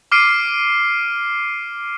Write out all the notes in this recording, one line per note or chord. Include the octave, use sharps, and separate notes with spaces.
D6 F6 C7 D7 D#7